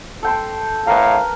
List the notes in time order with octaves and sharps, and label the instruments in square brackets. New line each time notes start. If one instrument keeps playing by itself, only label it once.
[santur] A4 G5 C6
[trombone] A2 [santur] A#4 B4 [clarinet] F5